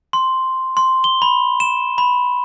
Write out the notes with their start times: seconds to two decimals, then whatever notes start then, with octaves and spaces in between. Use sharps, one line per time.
0.13 C6
0.77 C6
1.04 G7
1.22 B5
1.60 E7
1.98 B5